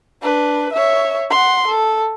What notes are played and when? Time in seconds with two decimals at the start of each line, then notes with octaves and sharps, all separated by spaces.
0.23 D4 B4
0.73 C#5 E5
1.31 F#5 C6
1.67 A4